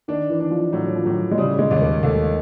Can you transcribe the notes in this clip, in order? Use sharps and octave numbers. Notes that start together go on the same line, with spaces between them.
D#3 D4
E3
D4
F3
A2 F#3
F3
A2 F#3
G#3
C#3 G3
G#3
D#2
A#3
D#2 A3